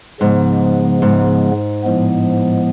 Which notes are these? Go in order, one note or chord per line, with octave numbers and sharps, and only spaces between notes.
G#2 C#3 F3 G#3 B3
G#2
A2 F3 G#3 B3